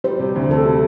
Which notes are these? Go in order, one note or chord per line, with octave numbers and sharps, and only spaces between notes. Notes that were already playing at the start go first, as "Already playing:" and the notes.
G3 C5
C3
D2
C4 A4
G3